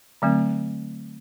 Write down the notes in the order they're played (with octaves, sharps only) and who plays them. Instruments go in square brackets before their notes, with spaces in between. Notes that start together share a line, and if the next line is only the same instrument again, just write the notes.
[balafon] D3 F#3 A3 C4